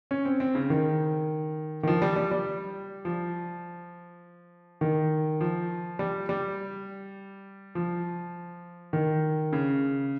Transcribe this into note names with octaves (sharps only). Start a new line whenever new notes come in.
C#4
C4
C4
C#3
D#3
D#3
F3
G3
G3
G3
F3
D#3
F3
G3
G3
F3
D#3
C#3